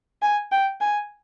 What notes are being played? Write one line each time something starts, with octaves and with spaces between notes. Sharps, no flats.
G#5
G5
G#5